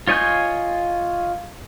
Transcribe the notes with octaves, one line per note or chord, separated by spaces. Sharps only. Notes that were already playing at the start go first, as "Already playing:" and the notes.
F4 C#5 D#5 G#5 G6